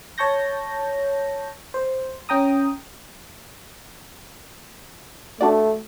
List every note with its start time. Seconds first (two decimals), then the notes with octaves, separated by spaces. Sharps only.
0.18 C#5 A5 C#6 G6 A#6
1.74 C5
2.29 C#4 G5 A#5 D#6
5.41 A3 D4 F#4 D5